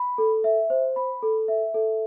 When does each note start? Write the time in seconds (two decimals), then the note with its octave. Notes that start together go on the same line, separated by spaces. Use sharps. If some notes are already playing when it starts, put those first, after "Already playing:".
Already playing: B5
0.18 A4
0.44 E5
0.70 C5
0.96 B5
1.23 A4
1.48 E5
1.74 A4